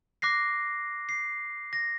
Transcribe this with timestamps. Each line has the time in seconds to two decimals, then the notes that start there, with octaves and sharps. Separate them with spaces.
0.22 D6 F#6 A#6 C7
1.09 C7
1.73 A#6